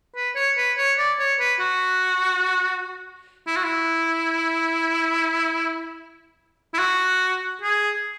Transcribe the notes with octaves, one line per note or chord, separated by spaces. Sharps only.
B4
C#5
B4
C#5
D5
C#5
B4
F#4
E4
F#4
E4
E4
F#4
G#4